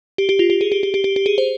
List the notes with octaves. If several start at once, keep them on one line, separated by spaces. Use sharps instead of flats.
G4
G4
F4
G4
G#4
G4
G4
G4
G4
G4
G#4
C5